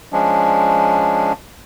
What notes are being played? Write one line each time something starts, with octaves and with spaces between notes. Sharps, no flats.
F3 G#3 C#4 D4